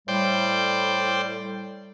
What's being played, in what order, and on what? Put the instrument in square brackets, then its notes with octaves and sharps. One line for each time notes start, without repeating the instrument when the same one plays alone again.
[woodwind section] A2 G3 [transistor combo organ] C5 D5 G5